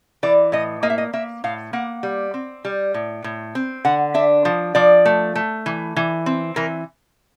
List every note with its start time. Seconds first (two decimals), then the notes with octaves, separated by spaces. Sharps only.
0.23 E3 D5
0.52 A2 D#5
0.83 A#3 D#5
0.90 E5
0.98 D#5
1.13 A#3 E5
1.44 A2 F5
1.73 A#3 F#5
2.03 G3
2.34 C4
2.65 G3
2.94 A2
3.24 A2
3.55 C4
3.85 D3 F#5
4.14 D4 E5
4.45 F3
4.75 F3 D5
5.05 A3
5.35 A3
5.66 E3
5.96 E3
6.26 C4
6.56 E3 A#4